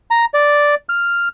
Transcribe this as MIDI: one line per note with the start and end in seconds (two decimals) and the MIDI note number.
0.11 0.25 82
0.34 0.75 74
0.89 1.28 89